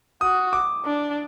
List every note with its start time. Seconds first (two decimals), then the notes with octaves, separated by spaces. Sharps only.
0.21 F#4 D#6
0.53 D6
0.85 D4